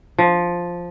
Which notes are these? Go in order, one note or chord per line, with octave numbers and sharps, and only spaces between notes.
F3